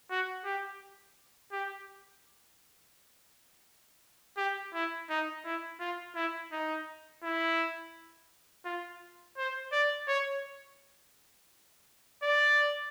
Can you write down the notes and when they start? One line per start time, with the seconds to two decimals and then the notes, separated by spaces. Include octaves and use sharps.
0.10 F#4
0.45 G4
1.52 G4
4.37 G4
4.74 E4
5.10 D#4
5.45 E4
5.80 F4
6.16 E4
6.52 D#4
7.24 E4
8.65 F4
9.37 C5
9.72 D5
10.08 C#5
12.23 D5